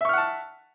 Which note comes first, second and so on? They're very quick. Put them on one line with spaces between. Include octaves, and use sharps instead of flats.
E5 C#6 F6 F#5 A5